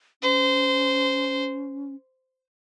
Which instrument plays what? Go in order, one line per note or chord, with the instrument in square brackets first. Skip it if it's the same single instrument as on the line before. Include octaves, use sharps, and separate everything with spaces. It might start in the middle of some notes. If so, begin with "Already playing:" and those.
[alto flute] C#4 [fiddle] C5